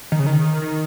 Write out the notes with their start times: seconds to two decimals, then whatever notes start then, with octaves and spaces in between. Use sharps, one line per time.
0.12 D#3
0.19 C#3
0.26 D#3
0.62 D#3